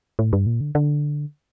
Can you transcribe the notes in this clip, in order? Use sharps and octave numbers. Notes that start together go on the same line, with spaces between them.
A2
G2
A#2
D3
D3